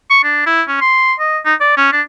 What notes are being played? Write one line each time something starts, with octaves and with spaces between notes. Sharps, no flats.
C#6
D4
E4
C#4
C6
D#5
D#4
D5
C#4
D4